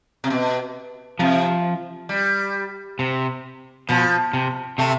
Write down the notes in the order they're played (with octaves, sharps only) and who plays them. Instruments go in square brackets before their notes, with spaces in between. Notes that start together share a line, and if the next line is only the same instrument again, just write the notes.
[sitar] C3
B2
[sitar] C3 [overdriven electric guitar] F3
[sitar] G3
[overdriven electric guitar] C3
[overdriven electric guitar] B2 [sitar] F3
[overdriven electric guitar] C3
[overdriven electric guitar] C3 [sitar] A3